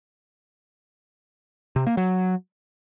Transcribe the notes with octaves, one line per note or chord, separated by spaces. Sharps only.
C3
A#3
F#3